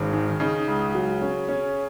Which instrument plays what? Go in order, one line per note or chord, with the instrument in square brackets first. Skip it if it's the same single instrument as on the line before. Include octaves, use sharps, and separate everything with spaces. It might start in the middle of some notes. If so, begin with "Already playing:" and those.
Already playing: [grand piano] G#1 [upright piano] C#3
[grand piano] D#3
[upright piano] C#3 [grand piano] D#4
[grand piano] C#2
F#3
C#4
C#4